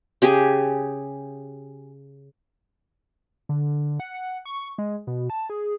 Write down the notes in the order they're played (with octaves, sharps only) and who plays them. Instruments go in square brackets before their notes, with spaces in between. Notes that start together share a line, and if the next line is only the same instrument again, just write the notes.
[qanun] C#3 G4 G#4 G#5
[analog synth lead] D3
F#5
F#5
C#6
G#3
B2
A5
G#4